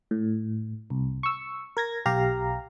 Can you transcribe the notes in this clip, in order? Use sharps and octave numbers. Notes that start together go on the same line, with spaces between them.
A2
C2
C#6 E6
A#4 G#6 A#6
B1 G4 F5 A#5